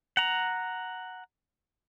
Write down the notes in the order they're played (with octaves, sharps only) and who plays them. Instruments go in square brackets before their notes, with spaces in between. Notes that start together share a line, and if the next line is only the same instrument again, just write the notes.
[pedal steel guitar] F#5 A#5